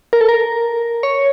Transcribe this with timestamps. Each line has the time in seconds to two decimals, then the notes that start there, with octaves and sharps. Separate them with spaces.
0.13 A#4
0.21 A4
0.29 A#4
1.03 C#5